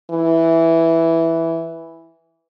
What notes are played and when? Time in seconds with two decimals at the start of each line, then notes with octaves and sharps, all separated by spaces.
0.11 E3